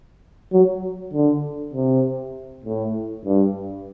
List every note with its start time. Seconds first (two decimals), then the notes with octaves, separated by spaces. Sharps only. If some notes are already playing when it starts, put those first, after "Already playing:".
0.53 F#3
1.13 D3
1.73 C3
2.64 A2
3.25 G2